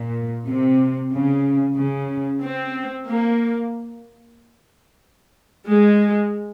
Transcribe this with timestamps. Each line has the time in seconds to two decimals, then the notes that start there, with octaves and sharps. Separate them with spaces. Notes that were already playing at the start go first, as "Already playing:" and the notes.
Already playing: A#2
0.47 C3
1.12 C#3
1.76 C#3
2.42 C4
3.08 A#3
5.67 G#3